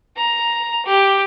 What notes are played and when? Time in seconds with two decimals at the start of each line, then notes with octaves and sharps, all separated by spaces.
0.16 A#5
0.85 G4